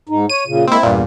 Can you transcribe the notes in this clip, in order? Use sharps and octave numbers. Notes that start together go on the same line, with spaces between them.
G#2 D#4
C#5 D#7
A#2 C#3
G#3 A#3 C4 E4
E2 G2 A#2